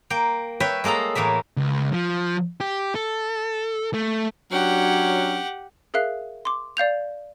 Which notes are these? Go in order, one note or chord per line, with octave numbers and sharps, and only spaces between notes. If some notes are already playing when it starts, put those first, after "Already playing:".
A#3 G5
B4 C#5 E5 G5
G#3 A#3 A4 D#5 A#5
A2 E3 A#3 E5
C#2
F3
G4
A4
A3
F#3 C#4 D4 G4 F#5
G#4 A#4 E5 F5 F#6
C6 D6
D5 F5 G6 F7